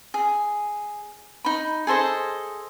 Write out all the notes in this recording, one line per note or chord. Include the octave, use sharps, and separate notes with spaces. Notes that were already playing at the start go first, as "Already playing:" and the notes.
G#4
D#4 B5
G#4 A4 C5 D#5